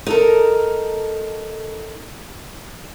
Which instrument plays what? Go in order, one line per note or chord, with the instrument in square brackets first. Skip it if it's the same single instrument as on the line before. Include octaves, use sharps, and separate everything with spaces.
[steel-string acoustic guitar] D#4 A4 A#4